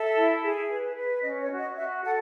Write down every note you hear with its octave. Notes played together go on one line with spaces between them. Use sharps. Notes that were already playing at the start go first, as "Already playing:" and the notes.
Already playing: A4 E5
E4
G#4
B4
B4
C#4 D#5
C#5
F#4
D#5
F#4 E5
A4 F#5